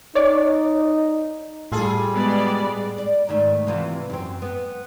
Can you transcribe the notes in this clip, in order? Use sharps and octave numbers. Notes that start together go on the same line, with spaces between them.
D#4 C#5 D5
A2 G3 F4 G#4 A4
G#3 B3 D5
D5
G#2 D#3 A3
C3 E3 F4
F#2 C4
B3